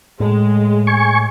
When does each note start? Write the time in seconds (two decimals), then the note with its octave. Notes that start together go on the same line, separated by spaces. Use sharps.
0.20 A2 G#3
0.87 G#5 C#6